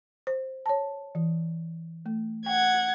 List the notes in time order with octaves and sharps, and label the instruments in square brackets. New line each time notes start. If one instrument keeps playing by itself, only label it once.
[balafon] C5
C#5 A5
E3
A3
[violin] F#5 G#6 [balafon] G5